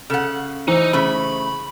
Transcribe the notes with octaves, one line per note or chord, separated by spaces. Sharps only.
C#3 A4 F#5
E3 D#4 C5
C#3 A3 B5